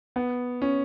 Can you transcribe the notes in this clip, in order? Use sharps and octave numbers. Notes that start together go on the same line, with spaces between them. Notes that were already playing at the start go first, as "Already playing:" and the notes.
B3
C#4